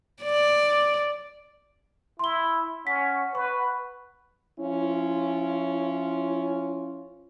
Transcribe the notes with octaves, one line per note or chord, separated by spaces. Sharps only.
D5
E4 C6 G7
C#4 F#5 B6
B4 C#6
F3 C#4 E4 F4